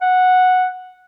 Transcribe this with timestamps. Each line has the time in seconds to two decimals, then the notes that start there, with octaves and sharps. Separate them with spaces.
0.01 F#5